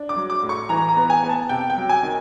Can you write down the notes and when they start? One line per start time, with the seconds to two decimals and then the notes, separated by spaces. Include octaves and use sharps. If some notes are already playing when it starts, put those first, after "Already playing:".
Already playing: D4
0.09 D6
0.16 F#3
0.30 D6
0.43 A2
0.49 C#6
0.69 E3 A#5
0.89 A#5
0.96 B3
1.10 G#5
1.23 B3
1.29 A5
1.49 C3 G5
1.70 G5
1.77 F#3
1.89 G#5
2.03 D#3